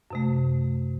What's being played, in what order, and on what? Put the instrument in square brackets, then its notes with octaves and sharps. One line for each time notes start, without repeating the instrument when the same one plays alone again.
[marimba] F#2 C3 A3